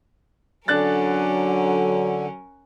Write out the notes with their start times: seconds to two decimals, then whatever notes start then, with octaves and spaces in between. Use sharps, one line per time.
0.68 D3 F#3 C#4 D4 A#4 F#6 A6